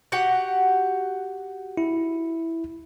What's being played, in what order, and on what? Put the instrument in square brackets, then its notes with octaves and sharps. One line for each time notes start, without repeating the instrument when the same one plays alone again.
[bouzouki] F#4 G4 F#5
[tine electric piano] E4